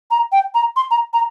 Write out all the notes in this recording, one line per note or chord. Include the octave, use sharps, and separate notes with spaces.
A#5
G5
A#5
C6
A#5
A#5